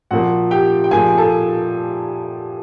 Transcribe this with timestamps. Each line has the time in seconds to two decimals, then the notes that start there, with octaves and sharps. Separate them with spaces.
0.11 A#2 F3 A#3 F#4 F#5
0.51 G4 G5
0.84 G5
0.91 A#2 F3 A#3 G#4 G#5
1.17 A4 A5